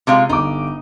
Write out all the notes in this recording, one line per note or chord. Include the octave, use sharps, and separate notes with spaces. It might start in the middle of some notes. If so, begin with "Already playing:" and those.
C3 G#3 F4
G1 D#4 D6